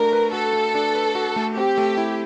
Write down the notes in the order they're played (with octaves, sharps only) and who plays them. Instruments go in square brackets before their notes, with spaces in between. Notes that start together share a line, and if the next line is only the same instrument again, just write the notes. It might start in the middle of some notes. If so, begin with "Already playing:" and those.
Already playing: [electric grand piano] A3 D4 F#4 [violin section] A#4
[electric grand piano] B4
[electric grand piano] F#4 [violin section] A4
[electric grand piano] A3
D4
B4
F#4
A3
[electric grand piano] C4 [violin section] G4
[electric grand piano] A3
E4